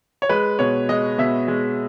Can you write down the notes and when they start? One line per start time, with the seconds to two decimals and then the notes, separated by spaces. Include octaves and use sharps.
0.22 C#5
0.29 G#3 B4
0.59 B2 C#5
0.89 G#3 D#5
1.18 B2 E5
1.48 G#3